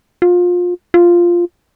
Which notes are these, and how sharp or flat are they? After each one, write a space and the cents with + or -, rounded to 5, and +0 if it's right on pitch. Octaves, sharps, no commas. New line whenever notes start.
F4 +25
F4 -5